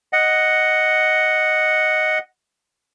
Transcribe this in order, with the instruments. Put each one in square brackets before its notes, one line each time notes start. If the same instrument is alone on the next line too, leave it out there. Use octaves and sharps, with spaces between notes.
[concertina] D#5 F#5